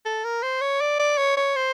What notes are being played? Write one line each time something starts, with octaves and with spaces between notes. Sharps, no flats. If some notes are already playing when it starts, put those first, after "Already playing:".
A4
A#4
C5
C#5
D5
D5
C#5
C#5
C5